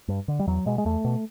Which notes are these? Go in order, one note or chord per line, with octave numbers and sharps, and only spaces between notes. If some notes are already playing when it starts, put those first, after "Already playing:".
G2
D3
G3
E2 F#3
B2 G#3
G#3
E2 A3
B2